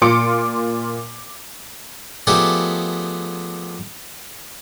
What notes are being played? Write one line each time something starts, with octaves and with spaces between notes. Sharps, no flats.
A#2 F4 C6 D6 C#7 D7
F3 A3 B3 G4 G#4 D5